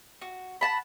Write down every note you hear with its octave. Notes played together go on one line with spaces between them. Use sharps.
F#4
F#5 A5 B5